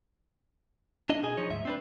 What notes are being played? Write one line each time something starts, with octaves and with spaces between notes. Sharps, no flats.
D4 D#4 D#5
B2 G#4 G#5
F3 D#4 C#5
D2 G#2 E5
C4 D4 B4